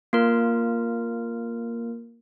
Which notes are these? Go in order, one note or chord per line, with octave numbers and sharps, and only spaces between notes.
A#3 F4 A#4